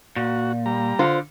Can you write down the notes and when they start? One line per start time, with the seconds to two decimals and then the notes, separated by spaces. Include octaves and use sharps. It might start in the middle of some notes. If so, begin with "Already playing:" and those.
0.16 A#2 F#4
0.66 G3 A#5
0.99 D3 F4 C5